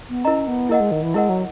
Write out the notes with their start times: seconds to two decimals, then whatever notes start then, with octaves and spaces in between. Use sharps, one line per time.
0.09 B3
0.25 C#4 E4 A#4 D#5 A#5
0.47 B3
0.69 A#3 E4 A#4 D#5 F#5
0.80 G#3
0.91 D#3
1.03 E3
1.14 G#3 E4 A#4 D#5 F#5
1.29 F#3